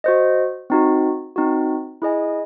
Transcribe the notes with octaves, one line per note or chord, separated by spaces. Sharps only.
F#4 C5 D#5
C4 D#4 F#4
C4 D#4 F#4
E4 G#4 D#5 G#5